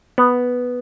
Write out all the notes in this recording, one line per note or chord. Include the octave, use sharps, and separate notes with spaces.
B3